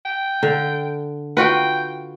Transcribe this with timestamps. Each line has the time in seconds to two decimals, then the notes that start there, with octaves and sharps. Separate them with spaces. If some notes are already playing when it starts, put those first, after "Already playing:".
0.05 G5
0.43 D3
1.37 F4 F#4 B4 G5